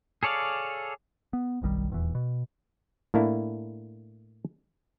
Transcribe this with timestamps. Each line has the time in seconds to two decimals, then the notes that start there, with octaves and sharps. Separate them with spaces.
0.23 G#4 A4 C#5 D5 F5
1.33 B3
1.62 F#1 B1 D#3 G3
1.90 D#1 E2 E3
2.15 B2
3.14 A2 A#3 D4 E4